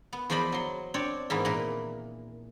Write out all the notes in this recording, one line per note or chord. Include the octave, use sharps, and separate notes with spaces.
B3
E2 F3 C5 D5 D#5 B5
F#3 C6
C4 D4 C#5 D5
G#2 E3 A#3 B3
A#2 E3 A#4